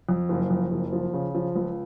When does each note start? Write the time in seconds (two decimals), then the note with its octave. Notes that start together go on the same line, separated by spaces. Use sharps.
0.09 F2
0.29 F#1
0.50 F2
0.71 F#1
0.93 F3
1.14 C#3
1.35 F3
1.56 C#2